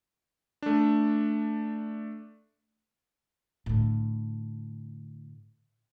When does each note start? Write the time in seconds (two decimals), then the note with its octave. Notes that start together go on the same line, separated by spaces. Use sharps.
0.62 A3 D4
3.66 A2 D3